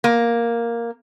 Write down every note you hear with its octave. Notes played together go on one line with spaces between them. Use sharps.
A#3